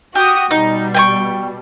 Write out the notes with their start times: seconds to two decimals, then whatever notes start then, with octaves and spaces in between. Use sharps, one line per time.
0.15 F#4 G4 D#6
0.51 B2 G3 D#4
0.94 G5 G#5 C#6